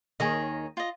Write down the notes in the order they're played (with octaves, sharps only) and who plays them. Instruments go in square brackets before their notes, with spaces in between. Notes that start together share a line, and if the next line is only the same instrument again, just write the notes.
[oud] D#2 D#3 [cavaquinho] G#4 C#5 D#5
[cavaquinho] F4 D#5